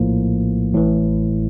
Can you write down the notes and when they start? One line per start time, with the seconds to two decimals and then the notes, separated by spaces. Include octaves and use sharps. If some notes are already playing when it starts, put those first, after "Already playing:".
Already playing: A#1 A2 F3 A#3
0.74 A1 A2 E3